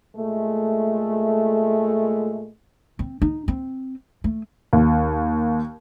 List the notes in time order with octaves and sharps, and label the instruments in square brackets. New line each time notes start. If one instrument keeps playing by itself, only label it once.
[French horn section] A#2 G#3 A3
[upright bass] C4
D#4
C4
A3
[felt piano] D#2